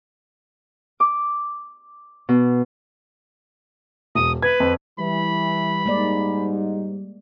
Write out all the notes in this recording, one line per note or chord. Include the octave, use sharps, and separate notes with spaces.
D6
B2
E1 D#6
B4 G#6
F2
E3 G3 B5
G#2 G#3 A#3 D#4 D5